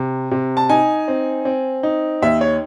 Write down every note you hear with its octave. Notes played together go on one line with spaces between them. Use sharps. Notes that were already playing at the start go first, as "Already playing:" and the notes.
Already playing: C3
C3
A5
D#4 G#5
C4
C4
D#4
D#2 E5
C#5